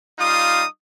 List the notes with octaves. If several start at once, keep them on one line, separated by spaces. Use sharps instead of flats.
G3 D#4 F4 F5 D#6